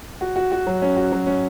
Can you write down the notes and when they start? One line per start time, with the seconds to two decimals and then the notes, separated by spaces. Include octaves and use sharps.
0.21 F#4
0.36 F#4
0.52 F#4
0.67 F#3
0.82 C#4
0.96 F#4
1.12 F#3
1.27 C#4